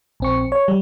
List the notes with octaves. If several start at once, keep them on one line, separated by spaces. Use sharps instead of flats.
A#1 C4 C#6
C#5
G3